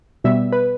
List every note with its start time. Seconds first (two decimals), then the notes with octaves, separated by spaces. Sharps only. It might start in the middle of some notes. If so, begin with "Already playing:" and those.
0.24 B2 G3 B3 E5
0.52 B4